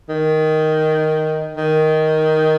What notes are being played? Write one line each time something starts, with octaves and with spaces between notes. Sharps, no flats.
D#3
D#3